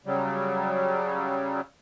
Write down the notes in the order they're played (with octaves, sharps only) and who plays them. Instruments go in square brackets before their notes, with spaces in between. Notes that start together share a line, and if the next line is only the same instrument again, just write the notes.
[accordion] C#3 F#3 G3